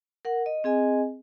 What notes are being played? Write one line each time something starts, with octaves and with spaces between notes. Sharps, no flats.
A#4 F#5
D#5
C4 G#4 D#5 G#5